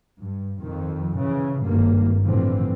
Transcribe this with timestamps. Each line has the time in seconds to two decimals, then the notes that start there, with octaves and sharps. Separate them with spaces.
0.20 G2
0.61 F2 D#3
1.18 C#3 E3
1.64 G#1 G2 A#3
2.24 A2 D3 E3 F3 G3 C4